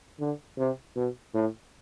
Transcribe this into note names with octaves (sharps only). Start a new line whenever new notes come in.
D3
C3
B2
A2